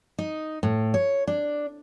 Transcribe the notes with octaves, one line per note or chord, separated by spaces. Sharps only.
D#4
A2
C#5
D4